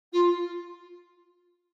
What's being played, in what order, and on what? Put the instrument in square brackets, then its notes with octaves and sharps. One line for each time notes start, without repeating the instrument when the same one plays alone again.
[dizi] F4